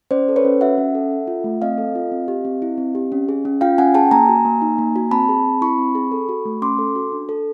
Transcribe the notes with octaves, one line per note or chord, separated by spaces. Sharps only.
C#4 C5 D5
A4
B4 C#5
C#4
F#4 E5 F#5
C#4
A4
A4
F4
A3
C4 D#5 F5
A4
F4
C4
G4
C4
E4
C4
G4
C#4
G#4
C#4
F4 F5 G5
C#4 F#5 G#5
G#4 G5 A5
A#3 G#5 A#5
F#4
A#3
D#4
A#3
F#4
C4 A5 B5
G#4
C4
E4 B5 C#6
C4
G#4
A4
F#4
A3
C#4 C6 D6
A4
F#4
D4
A4